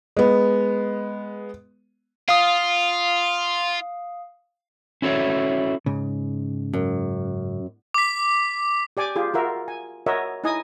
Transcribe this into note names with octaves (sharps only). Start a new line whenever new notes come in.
G#3 B3
F4 F5 D#6
C#4 E4 F#4 A4 C#5 E5
G#2 C#3
F#2
D6 B6
G4 D5 G#5 D6
F4 G4 G#4
F4 F#4 A#4 E5
G#5
F#4 A#4 C#5 D#5 E5
D#4 E4 D#5 G#5 D#6